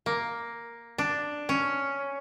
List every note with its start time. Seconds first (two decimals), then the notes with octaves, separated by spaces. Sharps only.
0.06 A#3
0.98 D4
1.49 C#4